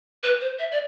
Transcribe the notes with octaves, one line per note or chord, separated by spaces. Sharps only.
B4
C5
E5
D5